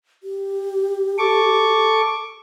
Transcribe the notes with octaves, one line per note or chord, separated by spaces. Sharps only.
G4
A4 C#6 D6